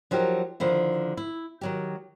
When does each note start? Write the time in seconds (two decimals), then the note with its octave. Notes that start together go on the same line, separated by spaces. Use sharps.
0.11 F3 F#3 D#4 G4 A#4
0.60 D3 D#3 F3 E4
1.17 E4
1.61 D#3 F#3 G4